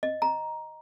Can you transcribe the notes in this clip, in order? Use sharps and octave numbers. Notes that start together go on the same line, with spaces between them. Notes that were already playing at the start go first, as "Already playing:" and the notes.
D#5
A#5